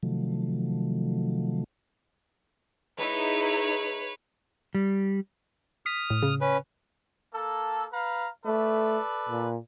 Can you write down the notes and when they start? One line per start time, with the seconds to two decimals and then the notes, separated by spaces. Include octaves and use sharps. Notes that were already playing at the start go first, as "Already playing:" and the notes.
0.03 C3 D#3 F3 F#3 A3
2.98 G#3 D#4 E4 B4 C#5
4.75 G3
5.86 D#6 F6 B6
6.10 A2
6.23 C#3
6.41 C#4 B4
7.35 A#3 A4
7.93 B4 F5 A#5
8.46 A3 A4 B4 D5
9.29 A#2